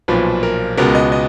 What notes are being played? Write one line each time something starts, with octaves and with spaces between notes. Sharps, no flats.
B1 A#2 F3 B4
A#4
C#2 B2 G#3 B3 A#4
D#5
D#5